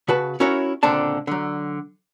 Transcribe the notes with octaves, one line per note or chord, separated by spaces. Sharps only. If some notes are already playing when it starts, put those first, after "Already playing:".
C#3 F#4 B4 A5
C#4 E4 F#4 A#4 C#5 E5
C#2 A#2 D3 C4 D4 A5
D3 F#3